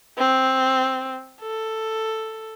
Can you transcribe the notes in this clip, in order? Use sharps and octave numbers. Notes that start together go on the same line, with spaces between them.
C4
A4